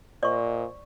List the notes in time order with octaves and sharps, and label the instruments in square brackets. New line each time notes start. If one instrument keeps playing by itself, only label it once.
[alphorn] A#2 [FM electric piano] C5 D#5 [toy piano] D5 C#6